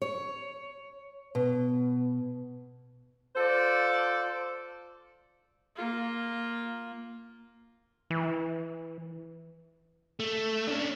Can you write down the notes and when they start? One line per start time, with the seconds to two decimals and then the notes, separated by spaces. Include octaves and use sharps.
0.02 C#5
1.35 B2
3.36 F4 A4 C5 D5
5.76 A#3 F4
8.10 E3
10.20 A3
10.67 C#4 D4